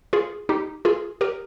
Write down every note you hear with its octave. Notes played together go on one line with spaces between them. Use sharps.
F4 G#4
D#4 G4
F4 G#4
G4 A#4